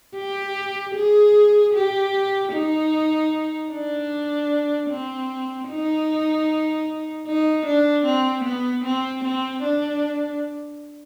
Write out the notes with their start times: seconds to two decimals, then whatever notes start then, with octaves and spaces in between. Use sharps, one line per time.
0.16 G4
0.95 G#4
1.74 G4
2.53 D#4
3.72 D4
4.90 C4
5.70 D#4
7.27 D#4
7.66 D4
8.05 C4
8.45 B3
8.84 C4
9.25 C4
9.63 D4